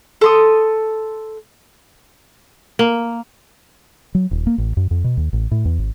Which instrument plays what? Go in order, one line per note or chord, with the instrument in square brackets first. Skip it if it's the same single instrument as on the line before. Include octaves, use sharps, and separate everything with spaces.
[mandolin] A4 C6 D#6
[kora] A#3
[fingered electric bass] F#3
D#1
A#3
A1
F#2
F2
B2
D#2
A1
A2
E2
G#1